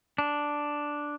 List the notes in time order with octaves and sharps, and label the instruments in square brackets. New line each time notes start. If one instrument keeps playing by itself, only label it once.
[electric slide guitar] D4